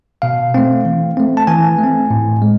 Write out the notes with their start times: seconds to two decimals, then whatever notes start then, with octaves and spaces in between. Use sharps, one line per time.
0.22 B2 F5
0.54 A3 C4
0.85 E3
1.17 A3 C4
1.37 A5
1.47 E3 G#5
1.79 A3 C4
2.10 A2
2.42 G#3